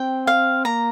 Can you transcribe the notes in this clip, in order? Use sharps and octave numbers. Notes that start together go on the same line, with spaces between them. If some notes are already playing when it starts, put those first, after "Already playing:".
Already playing: C4 G5
F5
A#3 A#5